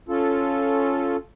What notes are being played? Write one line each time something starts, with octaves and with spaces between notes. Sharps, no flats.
C#4 F4 A4